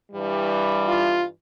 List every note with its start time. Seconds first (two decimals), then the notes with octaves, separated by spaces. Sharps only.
0.12 G2 E3 G3
0.85 F4